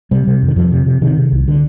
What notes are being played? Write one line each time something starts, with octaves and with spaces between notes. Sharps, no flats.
C3 G3
C3
F2
D#3
F2 F3
C3
C3
C3 D#3
C3
C2
D3